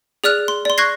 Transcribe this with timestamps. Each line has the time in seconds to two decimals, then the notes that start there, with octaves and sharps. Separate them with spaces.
0.24 G#4 D5 F6 F#6 F7
0.48 C6
0.65 D5 C6
0.78 C#6 F#6 G#6 A#6 C7